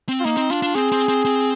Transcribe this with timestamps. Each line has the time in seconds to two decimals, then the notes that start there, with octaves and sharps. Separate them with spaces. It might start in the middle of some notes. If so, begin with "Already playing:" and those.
0.09 C4
0.20 F4
0.25 A#3 D#4
0.37 C4
0.50 D4 F4
0.62 D4
0.75 C4 G#4
0.92 C4
1.08 C4
1.25 C4